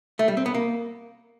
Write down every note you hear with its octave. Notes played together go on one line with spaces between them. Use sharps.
A3
G3
C4
B3
A#3